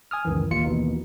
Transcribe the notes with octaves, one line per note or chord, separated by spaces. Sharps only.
G#5 D#6 F6
C#2 F#2 D#3 E3
A1 D#2 F4 C#7
D#2 B2 E3 D#4